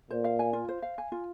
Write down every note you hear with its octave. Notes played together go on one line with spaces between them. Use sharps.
A#2 C5
F5
G#5
F4
C5
F5
G#5
F4